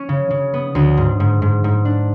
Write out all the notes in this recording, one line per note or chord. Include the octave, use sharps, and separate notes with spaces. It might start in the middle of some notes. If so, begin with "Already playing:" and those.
Already playing: C#4
C#3
C#3
B3
D2
G#2
G#2
G#2
G#2
D4